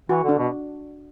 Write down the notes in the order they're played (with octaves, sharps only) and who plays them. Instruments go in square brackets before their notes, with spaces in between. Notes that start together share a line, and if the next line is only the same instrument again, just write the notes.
[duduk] E3 [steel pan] F#4
[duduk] D3
[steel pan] D4
[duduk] B2